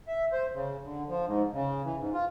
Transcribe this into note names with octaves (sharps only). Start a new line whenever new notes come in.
E5
C5
C#3
D3
F3
G#2
C#3
E3
G#2
F4